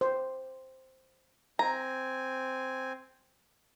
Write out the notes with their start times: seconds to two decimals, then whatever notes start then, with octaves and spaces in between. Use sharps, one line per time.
0.01 C5
1.59 C4 G#5 A#5